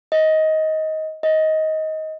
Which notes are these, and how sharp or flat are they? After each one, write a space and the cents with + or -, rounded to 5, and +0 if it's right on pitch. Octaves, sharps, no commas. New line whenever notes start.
D#5 +15
D#5 +15